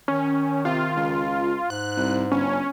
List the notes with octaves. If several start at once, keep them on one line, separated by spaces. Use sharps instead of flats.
D#3 C#4
C3 F4
C#2
G#2 F#6
C2
G1 C#4